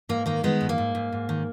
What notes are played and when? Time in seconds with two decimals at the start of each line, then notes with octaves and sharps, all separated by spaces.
0.09 G#2 A#3
0.26 D#3 A#3
0.43 D#3 G#3 B3
0.61 G#2
0.69 A#3
0.78 G#2
0.95 G#2
1.12 G#2
1.29 D#3